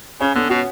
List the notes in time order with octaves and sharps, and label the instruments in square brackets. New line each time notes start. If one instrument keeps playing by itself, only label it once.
[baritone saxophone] C#3 [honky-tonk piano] C#4
[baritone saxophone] D3 [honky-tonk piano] B3
[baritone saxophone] B2 [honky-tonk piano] F#4